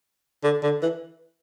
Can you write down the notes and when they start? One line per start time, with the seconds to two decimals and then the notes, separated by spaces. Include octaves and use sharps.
0.44 D3
0.63 D3
0.83 E3